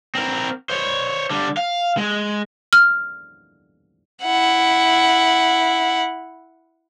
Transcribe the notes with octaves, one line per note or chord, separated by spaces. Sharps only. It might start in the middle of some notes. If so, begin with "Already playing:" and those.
C4 A#4
C5 C#5
D3 G3
F5
G#3
F6
E4 F#5